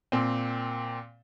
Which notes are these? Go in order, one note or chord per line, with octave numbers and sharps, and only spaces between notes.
A#2 C4